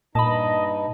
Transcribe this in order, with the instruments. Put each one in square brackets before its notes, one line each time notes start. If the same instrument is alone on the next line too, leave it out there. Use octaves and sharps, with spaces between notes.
[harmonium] G2 D#4 [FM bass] A#2 [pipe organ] D#5 [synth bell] A5 B5